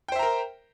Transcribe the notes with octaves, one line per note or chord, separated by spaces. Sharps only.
A#4 C5 E5 G5 A#5